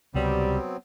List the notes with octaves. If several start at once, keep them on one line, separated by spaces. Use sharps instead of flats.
C#2 C3 F#3 G3 B3 C4